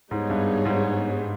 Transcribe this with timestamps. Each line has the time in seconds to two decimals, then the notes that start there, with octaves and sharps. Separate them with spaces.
0.11 G#2 G3 B3 D#4 G#4 C#5
0.30 G2
0.65 G#2